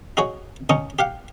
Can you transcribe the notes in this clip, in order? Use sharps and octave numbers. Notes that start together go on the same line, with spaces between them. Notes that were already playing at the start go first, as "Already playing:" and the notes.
D#4 F#4 G#4 C#5
C#2 C#4 D#4 D#5 C#6 D#6
G4 F5 F#5